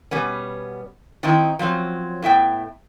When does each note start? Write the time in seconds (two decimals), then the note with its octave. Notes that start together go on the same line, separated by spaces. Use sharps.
0.11 B2 G3 B3 C#4
1.23 D#3 C4 D#4 E4
1.59 F3 F#3 C4 C#4
2.22 A2 B3 E5 G5